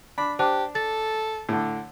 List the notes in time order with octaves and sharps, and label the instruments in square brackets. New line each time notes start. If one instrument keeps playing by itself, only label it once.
[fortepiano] D4 [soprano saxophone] B5
[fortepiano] D4 [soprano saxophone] G4 [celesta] C5 A5 F#6
[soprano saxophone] A4 [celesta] A6
[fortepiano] A2 D3